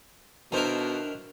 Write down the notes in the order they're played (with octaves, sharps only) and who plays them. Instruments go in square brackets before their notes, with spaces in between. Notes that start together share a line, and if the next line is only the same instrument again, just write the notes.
[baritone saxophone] B2 [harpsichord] D#3 E4 A#4 [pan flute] D4 [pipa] A4 C5